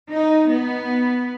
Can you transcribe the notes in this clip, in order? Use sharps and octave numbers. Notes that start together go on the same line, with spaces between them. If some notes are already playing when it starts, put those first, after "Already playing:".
D#4
B3